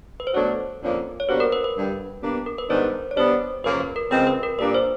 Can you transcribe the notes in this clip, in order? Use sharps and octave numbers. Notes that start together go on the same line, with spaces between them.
B4
C5
B2 F#3 A3 D4 F#4 C#5
F2 D3 F3 A#3 C#4
C#5
B2 G3 A#3 D4 F#4 C5
A#4
B4
B4
G2 D3 G3
B2 G3 A#3 D4
A#4
B4
G#2 D#3 G3 B3 D4 C5
C#5
B2 G3 B3 D4 C5
F#2 C#3 F3 A#3 B4
B4
A#4
C#3 F3 G#3 C4 B4
B4
A#4
A#2 G3 A#3 D4 B4
C5